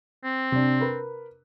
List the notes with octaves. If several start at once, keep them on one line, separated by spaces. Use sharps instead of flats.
C4
C3 D4
A#4 B4